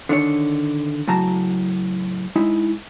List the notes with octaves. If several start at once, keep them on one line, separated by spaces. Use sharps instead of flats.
D3 D#3 D4 C#5
A2 C#3 F#3 A5 A#5
G#3 D#4 E4